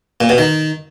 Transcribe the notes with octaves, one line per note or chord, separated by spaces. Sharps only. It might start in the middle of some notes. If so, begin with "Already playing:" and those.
A#2
B2
D#3